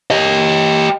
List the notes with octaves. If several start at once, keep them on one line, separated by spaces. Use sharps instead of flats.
G4 D#5